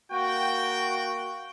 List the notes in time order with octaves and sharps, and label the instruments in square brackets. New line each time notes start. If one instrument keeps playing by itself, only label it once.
[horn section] A#3 G5 [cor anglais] F#4